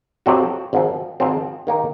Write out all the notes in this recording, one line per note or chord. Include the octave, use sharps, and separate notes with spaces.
F2 C3 F#3 C4 F#4
G#1 G#2 F3 C4
G#1 G#2 F3 C4
D#3 A#3 D#4 A#4